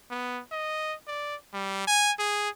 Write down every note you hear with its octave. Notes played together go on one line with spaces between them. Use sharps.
B3
D#5
D5
G3
G#5
G#4